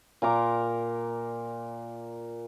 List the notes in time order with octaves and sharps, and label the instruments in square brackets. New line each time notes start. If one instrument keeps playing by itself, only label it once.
[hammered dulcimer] A#2 A#4 A#5 D6